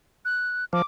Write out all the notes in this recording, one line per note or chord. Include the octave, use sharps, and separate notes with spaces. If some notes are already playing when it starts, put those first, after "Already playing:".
F#6
F3 D6